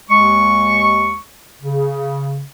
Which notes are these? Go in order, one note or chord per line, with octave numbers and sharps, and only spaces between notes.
D#2 G#3 C#6
C#3